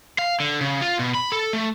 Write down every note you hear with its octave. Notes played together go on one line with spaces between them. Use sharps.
F5
D3
C#3
F4
B2
B5
A4
A3